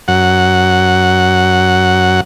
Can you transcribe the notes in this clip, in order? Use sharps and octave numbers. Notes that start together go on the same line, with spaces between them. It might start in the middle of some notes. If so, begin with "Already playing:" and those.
F#2 F#5